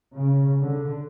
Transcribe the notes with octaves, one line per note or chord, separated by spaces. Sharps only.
C#3
D3